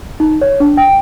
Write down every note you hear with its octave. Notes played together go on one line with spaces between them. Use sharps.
D#4
C#5
D4
G5